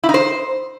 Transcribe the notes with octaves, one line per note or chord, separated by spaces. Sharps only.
E4
D#4
C5